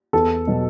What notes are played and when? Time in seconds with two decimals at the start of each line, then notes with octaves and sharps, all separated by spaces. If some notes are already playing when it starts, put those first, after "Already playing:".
0.13 E2 A4
0.47 B2 F#3